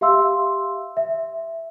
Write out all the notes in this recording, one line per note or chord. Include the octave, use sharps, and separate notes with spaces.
G4 E5 F5 C6 E6
E5